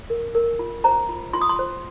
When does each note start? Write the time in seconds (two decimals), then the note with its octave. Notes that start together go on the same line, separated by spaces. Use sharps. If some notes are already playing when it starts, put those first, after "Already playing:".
0.10 A#4
0.35 A#4
0.59 F4
0.84 C5 A#5
1.09 F4
1.33 F4 C6
1.41 D#6
1.49 C6
1.59 C5